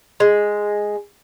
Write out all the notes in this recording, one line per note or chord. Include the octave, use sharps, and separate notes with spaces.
G#3